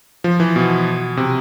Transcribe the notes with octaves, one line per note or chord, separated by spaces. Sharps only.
F3
E3
B2
C3